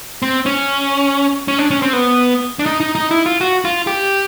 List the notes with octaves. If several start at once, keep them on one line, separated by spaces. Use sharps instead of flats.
C4
C#4
C#4
D4
C#4
C4
B3
D4
D#4
D#4
D#4
E4
F4
F#4
F4
G4